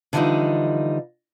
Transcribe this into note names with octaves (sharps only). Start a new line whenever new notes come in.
D3 E3 F3 G3 D#4